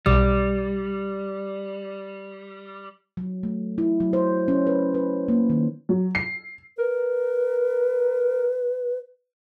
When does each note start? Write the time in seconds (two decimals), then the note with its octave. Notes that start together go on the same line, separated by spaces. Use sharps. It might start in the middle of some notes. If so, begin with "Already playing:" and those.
0.06 B1 B2 G3 D6
3.17 F#3
3.43 A3
3.78 E4
4.00 F#3
4.13 C5
4.48 C#4
4.67 B4
4.94 B4
5.28 A#3
5.50 D#3
5.89 F#3
6.15 C7
6.78 A#4 B4